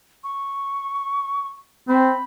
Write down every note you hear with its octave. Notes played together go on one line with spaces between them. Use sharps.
C#6
C4 B5